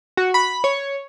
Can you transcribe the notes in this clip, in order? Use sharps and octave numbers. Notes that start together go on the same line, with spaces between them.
F#4
B5
C#5